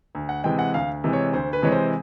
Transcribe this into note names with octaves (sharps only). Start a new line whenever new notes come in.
D2
F#5
C3 E3 G#3 G5
F#5
D2 F5
C3 E3 G#3
C#5
D2 C5
B4
C3 E3 G#3 C#5
C5